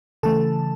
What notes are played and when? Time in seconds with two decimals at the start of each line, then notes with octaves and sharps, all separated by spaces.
0.23 C#3 E3 A3 A4 A5